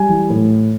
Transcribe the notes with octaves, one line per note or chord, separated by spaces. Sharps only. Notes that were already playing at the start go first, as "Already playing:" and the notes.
Already playing: G3 G#5
E3
A2